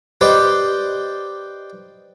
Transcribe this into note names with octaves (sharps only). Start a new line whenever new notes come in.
G4 B4 C5 D5 D#5 G5